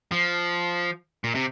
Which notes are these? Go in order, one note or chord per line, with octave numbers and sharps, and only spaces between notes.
F3
A#2
C3